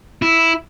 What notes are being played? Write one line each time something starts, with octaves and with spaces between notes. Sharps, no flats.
E4